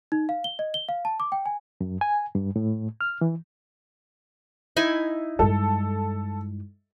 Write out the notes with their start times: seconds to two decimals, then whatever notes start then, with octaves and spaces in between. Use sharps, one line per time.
0.12 D#4
0.29 F5
0.44 G7
0.59 D#5
0.74 G7
0.89 F5
1.05 A5
1.20 D6
1.32 G5
1.46 G#5
1.81 F#2
2.01 G#5
2.35 G2
2.56 A2
3.01 F6
3.21 E3
4.77 D#4 E4 G#5
5.39 G2 G#3 A4